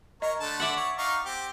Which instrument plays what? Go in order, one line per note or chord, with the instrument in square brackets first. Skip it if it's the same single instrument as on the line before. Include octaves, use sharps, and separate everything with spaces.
[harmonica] A#4 C#5 [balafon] D#5
[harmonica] D3 A3 A5
[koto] D5 E5 F#5
[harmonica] C#5
D#4 F5 C#6
C4 G4